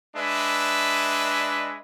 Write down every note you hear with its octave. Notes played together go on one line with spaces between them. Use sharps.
G#3 D4 B4 E5